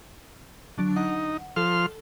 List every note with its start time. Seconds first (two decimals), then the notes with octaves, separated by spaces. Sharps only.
0.78 D3 F#3 D4
0.96 D#4 F#5
1.56 F3 A4 C6 F6